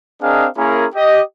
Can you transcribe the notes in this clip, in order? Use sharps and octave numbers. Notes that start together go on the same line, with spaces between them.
C4 D4 G#4 A#4 D#5 F5
A#3 C#4 E4 G#4 A#4
G4 D#5